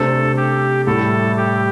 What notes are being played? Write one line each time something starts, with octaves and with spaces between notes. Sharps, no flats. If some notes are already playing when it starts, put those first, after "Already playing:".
Already playing: C3 A3 D4 A4 C5
G4
A2 G3 E4 A4
G4